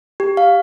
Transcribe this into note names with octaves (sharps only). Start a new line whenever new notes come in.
G4
F5